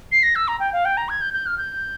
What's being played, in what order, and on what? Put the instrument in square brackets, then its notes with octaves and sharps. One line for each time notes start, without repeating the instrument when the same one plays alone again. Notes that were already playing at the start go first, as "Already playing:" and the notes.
[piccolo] C7
A#6
E6
A#5
G5
F5
G5
A#5
G#6
G6
G6
F6
G6